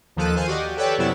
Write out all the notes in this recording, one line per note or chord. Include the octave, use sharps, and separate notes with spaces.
D#2 D#3 F3 A4 F#6 D#7
C5 F5 G#5 C7 D#7
F#4 G4 D5 D#5
G4
A4 B4 C#5 D5 G5
F#2 C3 F#3 B3 E4 E7